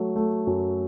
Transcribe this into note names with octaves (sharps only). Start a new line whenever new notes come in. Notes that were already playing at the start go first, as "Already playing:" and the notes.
Already playing: F#3 A3
A3
F#2